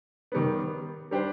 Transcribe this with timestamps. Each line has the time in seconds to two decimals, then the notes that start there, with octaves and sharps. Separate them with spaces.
0.32 D#3 G3 B3
1.11 G3 D4 G4 C5